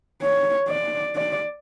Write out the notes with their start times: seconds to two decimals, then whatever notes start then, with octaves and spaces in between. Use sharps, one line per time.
0.22 C#5
0.69 D5
1.16 D5